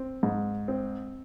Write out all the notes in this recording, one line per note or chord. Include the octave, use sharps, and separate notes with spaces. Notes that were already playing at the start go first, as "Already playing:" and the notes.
Already playing: C4
G#2
C4